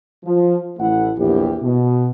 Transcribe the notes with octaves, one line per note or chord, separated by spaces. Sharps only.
F3
A1 A3 E4 F#5
A#1 E2 E4 G4
B2